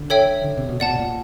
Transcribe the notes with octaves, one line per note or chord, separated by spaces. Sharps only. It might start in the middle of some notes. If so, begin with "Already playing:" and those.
Already playing: D3
A4 C#5 E5 G5
D3
C3
B2
A#2 D5 F#5 A5
B2
A#2